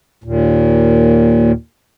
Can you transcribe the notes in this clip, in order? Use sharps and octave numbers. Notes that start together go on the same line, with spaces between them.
D#2 A#2